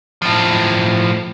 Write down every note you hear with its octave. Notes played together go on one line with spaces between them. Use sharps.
A2 F3